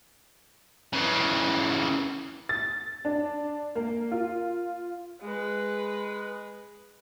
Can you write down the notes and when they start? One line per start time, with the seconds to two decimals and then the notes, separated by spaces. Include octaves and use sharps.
0.93 C#3 E3
2.49 A6
3.05 D4
3.76 A#3
4.11 F4
5.21 G#3 B4